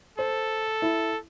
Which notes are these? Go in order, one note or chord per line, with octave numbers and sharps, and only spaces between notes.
A4 C5
E4